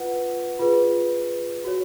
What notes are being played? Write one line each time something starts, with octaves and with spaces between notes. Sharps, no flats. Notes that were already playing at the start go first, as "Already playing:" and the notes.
Already playing: F4 B4 F#5
F4 G#4 B4
F#4 C#5